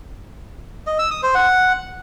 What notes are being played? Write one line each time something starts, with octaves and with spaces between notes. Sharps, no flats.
D#5
E6
D#6
C5
F#5